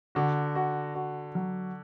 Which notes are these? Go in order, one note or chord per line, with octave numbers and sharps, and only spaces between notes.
D3 F#4
F#4
F#4
F#3